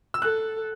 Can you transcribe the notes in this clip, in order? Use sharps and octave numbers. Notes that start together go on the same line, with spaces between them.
E6
A4 F#6